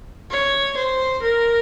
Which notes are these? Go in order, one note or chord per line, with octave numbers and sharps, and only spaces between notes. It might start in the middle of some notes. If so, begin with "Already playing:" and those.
C#5
C5
A#4